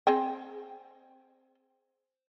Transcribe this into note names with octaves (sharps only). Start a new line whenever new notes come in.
C4 G#4 G5